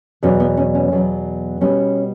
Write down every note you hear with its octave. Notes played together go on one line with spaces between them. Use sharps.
E2 B2 F#3 C#4
B3
C#4
C#4
E2 B2 F#3
B2 G3 B3 C#4